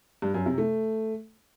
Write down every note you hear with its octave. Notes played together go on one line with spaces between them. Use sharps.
G2
F#2
C3
A3